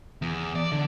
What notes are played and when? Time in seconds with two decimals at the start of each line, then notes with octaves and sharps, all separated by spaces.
0.22 E2
0.55 D5
0.72 D3